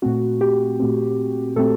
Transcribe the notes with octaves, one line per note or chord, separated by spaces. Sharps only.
A#2 A3 C4 F#4
G4
A#2 A3 C4
A#2 A3 C4 A4